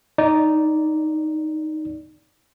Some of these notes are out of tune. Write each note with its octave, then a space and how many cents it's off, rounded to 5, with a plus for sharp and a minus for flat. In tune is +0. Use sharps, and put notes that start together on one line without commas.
D#4 +0 D5 -15